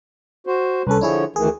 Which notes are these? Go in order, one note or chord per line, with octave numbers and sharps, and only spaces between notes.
F#4 C5
C2 C#4 A4 B4
D3 F3 D4 E4 G#4 C#5
D2 D#3 E3 G#4